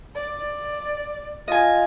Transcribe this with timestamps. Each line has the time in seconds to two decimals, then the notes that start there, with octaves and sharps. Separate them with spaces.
0.15 D5
1.48 F4 D#5 G#5